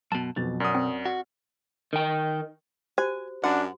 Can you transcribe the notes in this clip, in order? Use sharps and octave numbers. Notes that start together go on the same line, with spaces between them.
F#2 B2 A5
B1 F2 B2 A6
F#2 D5 F#5 D#6 F6
C4
F#4
D#3 G5
F#4 G4 C5 G#5
F#2 D4 F#4 F#5